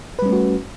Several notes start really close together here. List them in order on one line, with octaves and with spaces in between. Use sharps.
B4 G3 C#4 A3 F#4